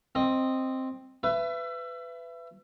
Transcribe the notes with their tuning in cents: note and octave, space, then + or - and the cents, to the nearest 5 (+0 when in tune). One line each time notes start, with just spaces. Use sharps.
C4 +5 D#5 +0
B4 +20 E5 +30